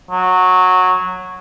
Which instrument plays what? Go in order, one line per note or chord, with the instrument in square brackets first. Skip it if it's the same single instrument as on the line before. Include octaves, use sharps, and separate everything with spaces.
[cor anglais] F#3